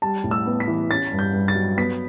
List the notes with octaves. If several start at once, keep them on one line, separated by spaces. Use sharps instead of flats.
G3 A5
A2
E6
B3
B6
E3
C#4 A6
G2
G6
G2
A6
F#3
B3 B6